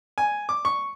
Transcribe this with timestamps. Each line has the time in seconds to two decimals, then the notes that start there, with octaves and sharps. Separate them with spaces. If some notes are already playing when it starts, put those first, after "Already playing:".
0.18 G#5
0.49 D6
0.65 C#6